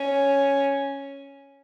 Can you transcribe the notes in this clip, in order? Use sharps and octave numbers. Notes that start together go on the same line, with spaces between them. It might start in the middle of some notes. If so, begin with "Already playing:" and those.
Already playing: C#4